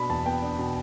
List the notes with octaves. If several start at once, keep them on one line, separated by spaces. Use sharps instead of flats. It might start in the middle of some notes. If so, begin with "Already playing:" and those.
Already playing: B2 B3 D4 B5
E2 A5
B3 G5
D4
B2